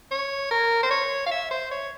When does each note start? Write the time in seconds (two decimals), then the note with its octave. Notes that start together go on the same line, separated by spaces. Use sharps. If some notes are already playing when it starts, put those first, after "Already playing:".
0.11 C#5
0.51 A#4
0.83 C5
0.91 C#5
1.26 F5
1.31 E5
1.51 C5
1.71 C#5